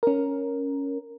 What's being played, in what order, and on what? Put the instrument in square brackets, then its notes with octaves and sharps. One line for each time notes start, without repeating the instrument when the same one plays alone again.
[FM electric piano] C#4 A#4